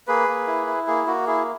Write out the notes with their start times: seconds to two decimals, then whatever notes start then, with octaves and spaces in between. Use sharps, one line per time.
0.08 A#3 G#4 B4
0.28 A#3
0.47 E4
0.67 E4
0.87 A#3 G#4
1.07 A#3 F#4
1.27 E4 G#4